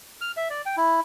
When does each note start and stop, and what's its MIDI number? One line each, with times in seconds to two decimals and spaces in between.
0.21 0.32 89
0.37 0.48 76
0.50 0.62 74
0.66 0.76 79
0.77 1.00 64